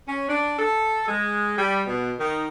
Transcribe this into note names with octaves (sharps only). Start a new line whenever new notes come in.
C#4
D4
A4
G#3
G3
B2
D#3